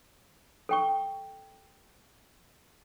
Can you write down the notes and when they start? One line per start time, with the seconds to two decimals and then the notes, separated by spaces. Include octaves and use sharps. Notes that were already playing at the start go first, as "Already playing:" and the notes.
0.69 A4 G5 C#6